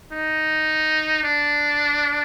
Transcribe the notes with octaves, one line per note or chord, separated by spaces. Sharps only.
D#4
D4